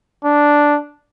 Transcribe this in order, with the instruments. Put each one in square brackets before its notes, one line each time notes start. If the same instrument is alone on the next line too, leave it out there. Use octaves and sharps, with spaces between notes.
[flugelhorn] D4